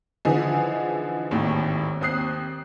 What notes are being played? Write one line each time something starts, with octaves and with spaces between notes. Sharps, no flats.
D3 E3 F3 D#4 G#4
G#1 D#2 A2
D#2 C4 D#6 F#6 C7